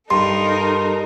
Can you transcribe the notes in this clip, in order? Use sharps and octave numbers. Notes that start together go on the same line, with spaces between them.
G2 D#4 A4 A#4 C6